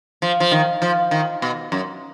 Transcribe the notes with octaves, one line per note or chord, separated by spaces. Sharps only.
F3
F3
D#3
F3
D#3
B2
F#2